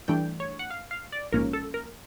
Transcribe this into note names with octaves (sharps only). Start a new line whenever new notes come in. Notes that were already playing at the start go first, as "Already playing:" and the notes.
G2 E3 A3 D4 G5
C#5
F#5
F5
F5
D5
A#1 G#2 F3 A#3 C#4 A#4
A4
A#4